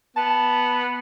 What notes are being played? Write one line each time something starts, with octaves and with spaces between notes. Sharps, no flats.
B3 A5